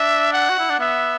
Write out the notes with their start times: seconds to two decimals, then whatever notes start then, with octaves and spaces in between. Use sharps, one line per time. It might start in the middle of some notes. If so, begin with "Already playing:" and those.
Already playing: D4 E5
0.33 F#5
0.49 F#4
0.59 E4
0.69 D4
0.79 B3 E5